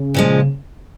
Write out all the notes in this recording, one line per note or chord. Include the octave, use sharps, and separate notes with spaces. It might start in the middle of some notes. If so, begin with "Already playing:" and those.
Already playing: C#3
A#2 F3 G#3